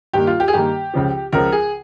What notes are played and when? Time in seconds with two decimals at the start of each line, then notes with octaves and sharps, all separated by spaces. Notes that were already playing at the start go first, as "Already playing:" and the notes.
0.13 G2 D#3 A#3 G4
0.27 F4
0.40 G4
0.48 G#4
0.53 G2 D#3 A#3 G4
0.94 C#2 C#3 F3
1.32 C#2 C#3 F3 A#4
1.52 G#4